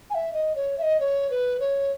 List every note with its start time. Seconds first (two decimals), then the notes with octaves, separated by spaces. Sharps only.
0.10 G#5
0.15 E5
0.33 D#5
0.56 C#5
0.78 E5
0.82 D#5
1.00 C#5
1.30 B4
1.60 C#5